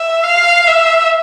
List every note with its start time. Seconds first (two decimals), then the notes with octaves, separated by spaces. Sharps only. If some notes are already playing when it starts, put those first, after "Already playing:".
Already playing: E5
0.23 F5
0.67 E5